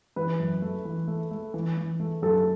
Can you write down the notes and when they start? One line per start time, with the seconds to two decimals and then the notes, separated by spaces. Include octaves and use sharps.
0.16 E3 B4
0.40 F#2
0.62 A3
0.85 E3
1.08 A3
1.31 A3
1.54 E3
1.77 E3
2.00 A3
2.22 F#2 A4